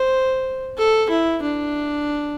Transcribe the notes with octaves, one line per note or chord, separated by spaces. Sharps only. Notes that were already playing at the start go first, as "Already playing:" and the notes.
Already playing: C5
A4
E4
D4